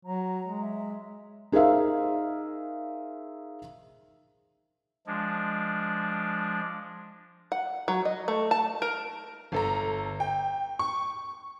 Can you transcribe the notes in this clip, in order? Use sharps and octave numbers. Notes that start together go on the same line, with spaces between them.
F#3 A#5
G#3
E5
D#4 G#4 A#4 C5 E5 F5
F3 G#3 D4
F#5
F#3
D#5
A3
A5
A#4
G1 A4 A#5
G5
C#6